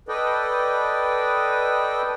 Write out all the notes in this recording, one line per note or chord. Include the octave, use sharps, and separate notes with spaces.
A4 B4 D5 D#5 G5